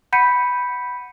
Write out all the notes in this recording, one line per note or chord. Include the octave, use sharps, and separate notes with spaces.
F#5 B5 G6 B6 C#7 D#7